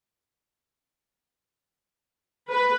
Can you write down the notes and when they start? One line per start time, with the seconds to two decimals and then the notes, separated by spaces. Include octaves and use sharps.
2.51 B4